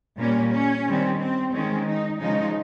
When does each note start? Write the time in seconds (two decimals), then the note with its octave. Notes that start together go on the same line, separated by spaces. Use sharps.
0.18 A#2 G3 A#3 C#4
0.51 C#4
0.86 D#3 G3 C4
1.19 C4
1.52 D#3 G#3 C4 C#4
1.86 D#4
2.19 C#3 F3 G#3 D#4